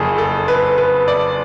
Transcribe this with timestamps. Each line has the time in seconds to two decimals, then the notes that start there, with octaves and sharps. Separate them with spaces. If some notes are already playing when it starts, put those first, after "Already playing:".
Already playing: F#1 F2 F3 G#4 A4
0.18 A4
0.48 B4
0.78 B4
1.08 D5